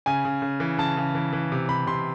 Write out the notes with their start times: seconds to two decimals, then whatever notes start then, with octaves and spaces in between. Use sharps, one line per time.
0.06 C#3 G#5
0.25 C#3
0.42 C#3
0.60 E3
0.78 C#3 A5
0.97 C#3
1.15 E3
1.33 E3
1.52 C3
1.69 C3 B5
1.87 C3 C6